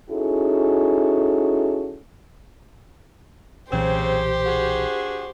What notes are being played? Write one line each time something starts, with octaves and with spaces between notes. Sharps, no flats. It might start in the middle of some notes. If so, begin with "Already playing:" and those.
C#4 D#4 E4 F#4 G#4 A4
B1 A#2 C#3 E3 C4 C#4 G4 C5
D4 F#4 G#4